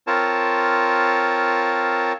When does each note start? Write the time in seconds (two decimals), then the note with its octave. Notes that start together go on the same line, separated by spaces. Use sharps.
0.07 C4 F4 A#4 C#5 A5